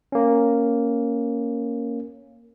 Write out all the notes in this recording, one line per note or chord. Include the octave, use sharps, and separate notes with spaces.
A#3 C#4